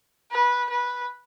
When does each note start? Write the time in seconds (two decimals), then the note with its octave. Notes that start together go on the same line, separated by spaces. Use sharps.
0.32 B4
0.70 B4